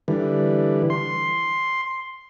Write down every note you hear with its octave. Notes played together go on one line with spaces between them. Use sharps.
D3 E3 G3
C6